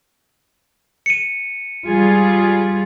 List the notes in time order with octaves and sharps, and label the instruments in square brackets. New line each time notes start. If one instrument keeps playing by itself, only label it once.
[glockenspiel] C#7 D#7
[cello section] G3 F4 G#4